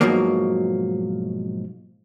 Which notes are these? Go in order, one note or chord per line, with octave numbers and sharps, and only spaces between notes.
G#2 B2 F3 F#3 A#3